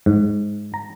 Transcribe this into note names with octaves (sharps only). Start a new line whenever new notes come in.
G#2
A#5